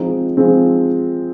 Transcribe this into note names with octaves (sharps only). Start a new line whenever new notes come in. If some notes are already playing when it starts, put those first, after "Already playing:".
Already playing: F3 G#3 C4 D#4
F3 G#3 C4 D#4